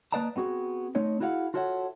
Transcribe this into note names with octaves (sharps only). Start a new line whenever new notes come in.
A#3 B4 D5 D#5 A5 A#5
B3 C4 F#4 G#4
A3 C4 D#4 C#5 D#5
E4 F#4 G#4 D#5 F5 F#5
F4 F#4 A4 C#5 E5 F#5